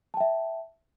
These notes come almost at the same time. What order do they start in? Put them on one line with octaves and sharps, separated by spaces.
A5 G5 E5